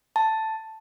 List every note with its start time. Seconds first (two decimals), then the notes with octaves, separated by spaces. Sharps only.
0.16 A5